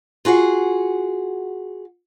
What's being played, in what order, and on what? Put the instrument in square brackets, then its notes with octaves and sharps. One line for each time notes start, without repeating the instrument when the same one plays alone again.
[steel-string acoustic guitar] F4 F#4 G#4 F#5